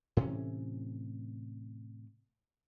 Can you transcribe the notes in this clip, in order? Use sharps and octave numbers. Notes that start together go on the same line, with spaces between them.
A2 C3 E3 C#4